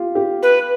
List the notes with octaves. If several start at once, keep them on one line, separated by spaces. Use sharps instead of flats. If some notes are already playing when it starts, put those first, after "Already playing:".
Already playing: F4 G4
G4
B4